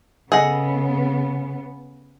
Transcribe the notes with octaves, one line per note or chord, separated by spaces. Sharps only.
C#3 B3 G#4 A4 D#5 F#5